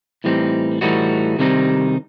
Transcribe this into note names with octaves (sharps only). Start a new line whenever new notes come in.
A2 E3 G3 C4 D#4
A2 E3 G3 D#4 F#4
C3 D#3 G3 C4 D#4